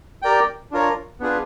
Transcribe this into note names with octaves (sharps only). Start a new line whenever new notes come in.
G4 A#4 D5 G5
D4 F4 A#4 C#5
B3 D4 F4 G#4 B4